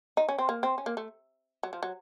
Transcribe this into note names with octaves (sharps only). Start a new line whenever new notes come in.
D#4
C#4
C4
A#3
C4
C#4
A#3
A3
F#3
F3
F#3